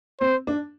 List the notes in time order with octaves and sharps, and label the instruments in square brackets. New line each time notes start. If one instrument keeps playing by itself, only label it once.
[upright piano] C4 [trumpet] C5
[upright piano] D4